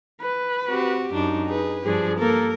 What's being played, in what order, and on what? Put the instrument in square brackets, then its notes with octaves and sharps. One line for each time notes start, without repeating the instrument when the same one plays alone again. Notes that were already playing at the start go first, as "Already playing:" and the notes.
[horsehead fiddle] B4
[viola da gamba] C4 F#4 G4
[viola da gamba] F#2 D4 [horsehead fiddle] D#4
[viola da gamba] G#4 B4
[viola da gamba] G2 F3 [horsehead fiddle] D4 G#4
[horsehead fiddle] A#3 A4 [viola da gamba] A#4